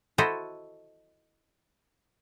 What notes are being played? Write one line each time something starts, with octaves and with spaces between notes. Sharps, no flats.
E4 F#4 A4 C5 D#5